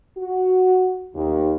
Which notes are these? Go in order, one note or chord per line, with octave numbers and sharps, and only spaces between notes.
F#4
D#2